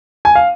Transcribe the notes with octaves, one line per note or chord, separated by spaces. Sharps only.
G#5
F5